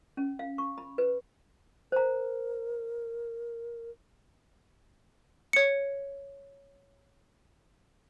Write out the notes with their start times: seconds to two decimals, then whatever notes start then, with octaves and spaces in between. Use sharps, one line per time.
0.17 C#4
0.39 F5
0.58 C#6
0.78 B5
0.98 B4
1.92 A#4 C5 A#5
5.53 C#5 C#7